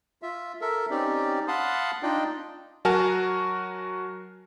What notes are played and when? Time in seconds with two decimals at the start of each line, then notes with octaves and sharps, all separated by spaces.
0.22 F4 E5
0.61 A4 A#4 E5
0.91 C4 C#4 D#4 G4 D5
1.48 F5 F#5 A5 B5 C6 D#6
2.03 D4 D#4 F4 D5 D#5 G5
2.85 F#3 F#4 A#4 G#5 A5 F6